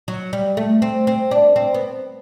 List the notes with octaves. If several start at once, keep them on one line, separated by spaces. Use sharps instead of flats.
F#3
G3
A3
C4
C4
D4
C4
B3